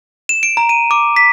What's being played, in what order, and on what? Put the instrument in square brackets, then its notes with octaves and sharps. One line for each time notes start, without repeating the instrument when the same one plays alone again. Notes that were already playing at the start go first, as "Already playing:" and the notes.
[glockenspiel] E7
D7
A#5
D#7
D6
B6